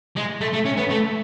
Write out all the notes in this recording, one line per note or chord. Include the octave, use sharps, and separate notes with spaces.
G#3
A3
A3
C#4
B3
A3